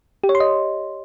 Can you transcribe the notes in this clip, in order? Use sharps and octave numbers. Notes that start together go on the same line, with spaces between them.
G4
C#5
C6
D#5